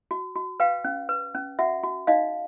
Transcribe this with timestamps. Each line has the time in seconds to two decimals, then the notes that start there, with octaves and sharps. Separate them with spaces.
0.11 F#4
0.36 F#4
0.60 B4 F5 G5
0.84 C#4
1.09 B4
1.35 C#4
1.59 F#4 E5 F#5
1.83 F#4
2.07 D#4 D#5 F5